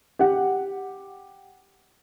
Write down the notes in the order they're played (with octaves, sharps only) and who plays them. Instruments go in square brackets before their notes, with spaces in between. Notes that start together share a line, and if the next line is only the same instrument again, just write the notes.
[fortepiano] G4 F#5